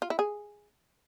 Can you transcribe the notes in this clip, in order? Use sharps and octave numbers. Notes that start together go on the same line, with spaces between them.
F4
E4
G#4